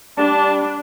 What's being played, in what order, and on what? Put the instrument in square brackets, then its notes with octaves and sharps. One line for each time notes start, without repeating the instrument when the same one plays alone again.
[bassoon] G3 [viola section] D4 [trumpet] A5